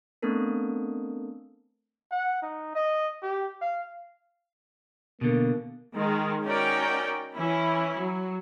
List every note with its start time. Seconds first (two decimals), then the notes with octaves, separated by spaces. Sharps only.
0.22 A3 B3 C4 D4 A4 A#4
2.11 F#5
2.42 D#4
2.75 D#5
3.22 G4
3.62 F5
5.21 B2 D3 A#3
5.95 D#3 G#3
6.45 C#4 D#4 F#4 A#4 D5 G5
7.37 E3 C#4 E4
7.97 F#3